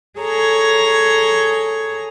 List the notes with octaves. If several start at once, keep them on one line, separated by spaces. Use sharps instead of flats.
G#4 A4 C#5 A#5